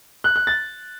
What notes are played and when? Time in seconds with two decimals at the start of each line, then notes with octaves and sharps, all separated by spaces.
0.24 F#6
0.36 F#6
0.47 A6